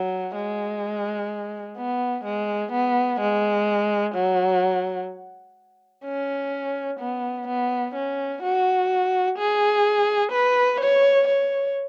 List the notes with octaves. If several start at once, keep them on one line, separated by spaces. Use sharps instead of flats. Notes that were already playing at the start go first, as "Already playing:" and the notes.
Already playing: F#3
G#3
B3
G#3
B3
G#3
F#3
C#4
B3
B3
C#4
F#4
G#4
B4
C#5
C#5